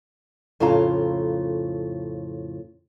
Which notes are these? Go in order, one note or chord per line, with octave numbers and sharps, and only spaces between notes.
F2 A2 C#3 F4 A#5